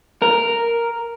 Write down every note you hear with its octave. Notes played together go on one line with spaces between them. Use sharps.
A#4